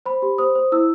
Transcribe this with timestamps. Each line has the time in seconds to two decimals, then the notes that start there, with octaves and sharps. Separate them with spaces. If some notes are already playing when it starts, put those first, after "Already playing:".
0.06 C5 B5
0.22 G4
0.38 C5 D#6
0.55 C5
0.72 E4 E6